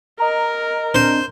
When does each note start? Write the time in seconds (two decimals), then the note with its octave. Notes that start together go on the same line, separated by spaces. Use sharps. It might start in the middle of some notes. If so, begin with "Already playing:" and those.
0.20 A#4 D#5 A#5
0.95 C4 D4 C5